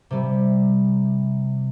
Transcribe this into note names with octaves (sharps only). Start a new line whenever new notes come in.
C3 G3